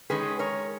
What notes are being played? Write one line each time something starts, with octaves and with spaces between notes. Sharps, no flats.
D#3 G#3 C#4 G#4 B4
A#4 C#5